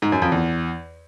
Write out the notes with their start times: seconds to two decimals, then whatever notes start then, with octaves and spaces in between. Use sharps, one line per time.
0.02 G#2
0.12 F#2
0.22 F2
0.32 E2